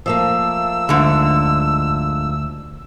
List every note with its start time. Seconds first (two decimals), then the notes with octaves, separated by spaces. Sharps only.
0.06 F3 A3 A#3 E6
0.89 D2 G#2 D3